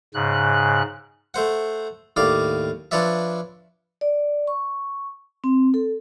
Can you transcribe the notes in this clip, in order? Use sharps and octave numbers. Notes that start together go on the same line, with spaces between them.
G#2 C#3 F#6
A3 C5 F#5
D#2 A2 D5 F5 D6
F3 D4 B4 C#5 D5 E5
D5
C#6
C4
A4